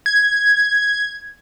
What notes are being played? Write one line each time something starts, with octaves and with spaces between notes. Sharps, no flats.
G#6